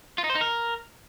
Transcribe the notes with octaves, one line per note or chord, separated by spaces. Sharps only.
F4
D#4
C5
D#4
A#4